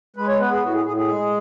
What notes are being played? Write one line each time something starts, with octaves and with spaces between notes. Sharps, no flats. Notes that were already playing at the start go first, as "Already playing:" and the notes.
G#3 B4
C#5
B3 B4
G#4
A2 F#4
G#4
A2 G#4
G#4
G#3